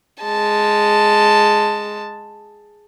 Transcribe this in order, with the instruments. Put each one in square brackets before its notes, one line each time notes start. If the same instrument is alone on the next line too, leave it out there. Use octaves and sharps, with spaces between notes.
[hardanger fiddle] G#3 A5